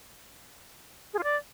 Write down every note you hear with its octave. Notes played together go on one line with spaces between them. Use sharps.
G#4
F4
D5